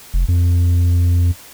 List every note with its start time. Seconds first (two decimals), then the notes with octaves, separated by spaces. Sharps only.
0.14 F1
0.28 F2